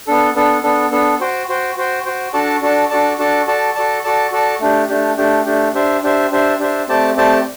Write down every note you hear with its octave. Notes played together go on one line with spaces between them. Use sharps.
B3 D4 A4
B3 D4 A4
B3 D4 A4
B3 D4 A4
F#4 C5 G5
F#4 C5 G5
F#4 C5 G5
F#4 C5 G5
D4 F#4 A4 D5 A5
D4 F#4 A4 D5 A5
D4 F#4 A4 D5 A5
D4 F#4 A4 D5 A5
F#4 A4 D5 A5
F#4 A4 D5 A5
F#4 A4 D5 A5
F#4 A4 D5 A5
A3 D4 G4
A3 D4 G4
A3 D4 G4
A3 D4 G4
D4 G4 C5 E5
D4 G4 C5 E5
D4 G4 C5 E5
D4 G4 C5 E5
A3 C4 G4 D5 A5
A3 C4 G4 D5 A5